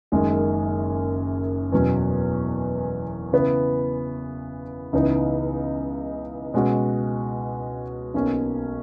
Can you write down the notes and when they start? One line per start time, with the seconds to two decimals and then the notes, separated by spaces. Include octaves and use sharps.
0.12 F#1 F#2 D#3 G#3 D#4
1.72 E2 B2 F#3 C#4
3.33 C#3 E3 B3
4.93 C#2 C#3 E3 B3 D#4
6.54 B2 G#3 C#4 F#4
8.14 B1 B2 A#3 C#4